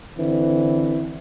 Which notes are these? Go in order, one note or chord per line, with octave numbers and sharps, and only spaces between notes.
D3 E3 C4